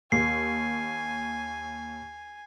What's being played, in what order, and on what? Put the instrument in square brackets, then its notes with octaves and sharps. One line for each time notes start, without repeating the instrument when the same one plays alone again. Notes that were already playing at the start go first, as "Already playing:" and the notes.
[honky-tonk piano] D#2 [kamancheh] G#5 [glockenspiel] C7